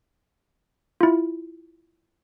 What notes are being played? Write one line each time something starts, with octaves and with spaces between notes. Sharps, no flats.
E4 F4